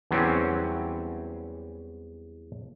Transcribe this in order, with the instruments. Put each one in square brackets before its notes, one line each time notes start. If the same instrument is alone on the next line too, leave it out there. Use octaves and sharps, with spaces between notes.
[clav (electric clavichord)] E2 E3 F#3 G3 C4 C#4